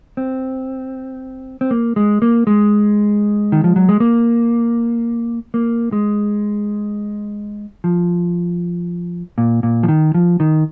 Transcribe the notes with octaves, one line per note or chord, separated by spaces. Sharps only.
C4
C4
A#3
G#3
A#3
G#3
D#3
F3
F#3
G#3
A#3
A#3
G#3
F3
A#2
A#2
F3
D#3
F3
D#3